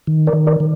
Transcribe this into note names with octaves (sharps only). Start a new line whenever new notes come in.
D#3
A#4 D5
D#3
A#4 D5
D#3